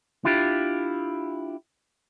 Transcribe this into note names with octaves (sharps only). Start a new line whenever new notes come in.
D4 E4 F4 G4